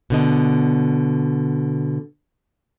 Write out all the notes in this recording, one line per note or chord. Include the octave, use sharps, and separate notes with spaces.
B2 D3 D#5